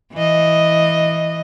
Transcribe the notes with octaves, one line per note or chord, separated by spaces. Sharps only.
E3 D#5